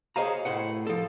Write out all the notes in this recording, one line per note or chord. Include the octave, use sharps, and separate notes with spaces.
G#4 C5 C#5 D#5 F5 A#5
A2 C5 F#5
F3 A4